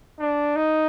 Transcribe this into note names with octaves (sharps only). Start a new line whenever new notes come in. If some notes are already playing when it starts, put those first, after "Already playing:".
D4
D#4